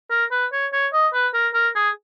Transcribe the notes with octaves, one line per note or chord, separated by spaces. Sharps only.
A#4
B4
C#5
C#5
D#5
B4
A#4
A#4
G#4